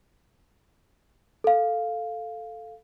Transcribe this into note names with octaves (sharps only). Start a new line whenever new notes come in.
A4 F5